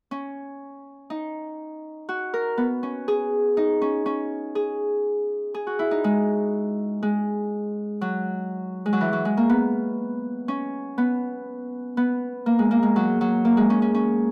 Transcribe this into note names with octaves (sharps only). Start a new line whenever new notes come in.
C#4
D#4
F#4
A#4
B3
C#4
G#4
D#4
C#4
C#4
G#4
G#4
F#4
E4
D#4
G#3
G#3
F#3
G#3
F#3
E3
F#3
G#3
A#3
B3
C#4
B3
B3
A#3
G#3
A#3
G#3
F#3
F#3
A#3
G#3
C#4
C#4
C#4